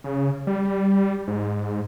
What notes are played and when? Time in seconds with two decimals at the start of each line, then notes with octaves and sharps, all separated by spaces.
0.04 C#3
0.47 G3
1.28 G#2